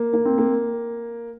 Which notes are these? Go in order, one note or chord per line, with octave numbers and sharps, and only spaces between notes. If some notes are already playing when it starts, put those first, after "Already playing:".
Already playing: A#3
A#3
C4
A#3